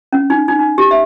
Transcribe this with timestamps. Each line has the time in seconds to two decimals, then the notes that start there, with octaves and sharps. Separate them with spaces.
0.13 C#4
0.30 D#4
0.48 D#4
0.59 D#4
0.78 G4
0.91 E5